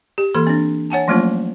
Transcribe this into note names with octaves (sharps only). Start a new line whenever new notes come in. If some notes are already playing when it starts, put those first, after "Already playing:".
G4
E3 A#3 A4 C6
C4 D4
C#5 F#5 G#5 A5
F3 F#3 A3 A#3 C#4 F4